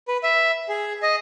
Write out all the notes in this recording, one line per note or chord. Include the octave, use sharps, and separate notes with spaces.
B4
E5
G#4
D#5